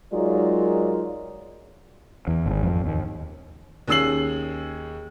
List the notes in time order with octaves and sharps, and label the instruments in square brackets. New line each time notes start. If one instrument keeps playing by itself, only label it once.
[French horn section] F#3 G#3 D#4 F4 A#4 D5
[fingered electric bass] E2
G#1
F2
D#2
[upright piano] D#2 C#4 G#4 E6 C7 F#7